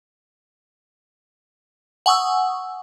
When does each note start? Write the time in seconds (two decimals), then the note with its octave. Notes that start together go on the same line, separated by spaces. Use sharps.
2.06 F#5 G#5 C#6 D#6 E6